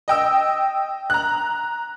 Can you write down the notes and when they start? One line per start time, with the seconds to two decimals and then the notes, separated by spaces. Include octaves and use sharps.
0.08 D#5 G5 E6
1.10 A#5 F#6